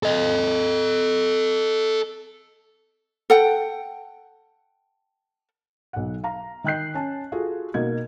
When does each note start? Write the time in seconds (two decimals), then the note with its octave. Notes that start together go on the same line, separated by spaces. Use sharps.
0.03 A4 D#5
3.30 A4 F#5 G5
5.93 B1 F#5
6.23 F5 A#5
6.64 D#3 D#5 G5 F#6 G6 C7
6.94 C#4 A5
7.32 F4 F#4 G#4 A4
7.74 B2 A#3 D#4 G#6